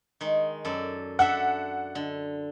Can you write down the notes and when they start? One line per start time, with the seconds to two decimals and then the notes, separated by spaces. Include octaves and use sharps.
0.21 D#3 G#3
0.65 F#2 A4 D5
1.19 D4 A4 E5 F#5
1.95 D3